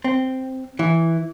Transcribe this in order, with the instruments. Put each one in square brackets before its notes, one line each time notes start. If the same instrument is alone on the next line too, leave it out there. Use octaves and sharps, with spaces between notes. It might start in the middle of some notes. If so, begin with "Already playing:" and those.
[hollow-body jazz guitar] C4
E3